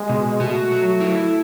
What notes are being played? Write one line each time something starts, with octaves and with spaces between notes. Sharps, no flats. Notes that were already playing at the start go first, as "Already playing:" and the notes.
Already playing: G#3
B2
A3 F#4
F#3
E4